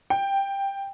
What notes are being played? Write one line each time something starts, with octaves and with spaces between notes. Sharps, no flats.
G5